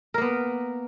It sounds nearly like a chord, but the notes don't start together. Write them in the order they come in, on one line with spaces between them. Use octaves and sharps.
A#4 A#3 B3